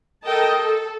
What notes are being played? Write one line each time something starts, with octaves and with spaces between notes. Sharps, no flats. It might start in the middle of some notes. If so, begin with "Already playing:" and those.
A4 A#4 D#5 G5 A5
A4